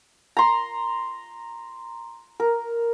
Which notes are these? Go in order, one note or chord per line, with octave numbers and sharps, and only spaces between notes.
A#5 C6
A#4